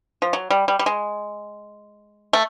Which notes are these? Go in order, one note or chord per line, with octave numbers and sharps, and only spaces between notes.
F3
F#3
G3
G3
G3
G#3
A3